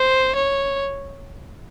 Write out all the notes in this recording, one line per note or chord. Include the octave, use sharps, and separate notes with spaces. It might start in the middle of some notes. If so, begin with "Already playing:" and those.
Already playing: C5
C#5